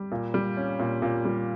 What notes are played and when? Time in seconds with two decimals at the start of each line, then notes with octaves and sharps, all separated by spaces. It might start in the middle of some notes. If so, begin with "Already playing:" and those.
Already playing: G3
0.11 A#2
0.34 G3
0.57 C#4
0.79 A#2
1.02 A#2
1.25 G3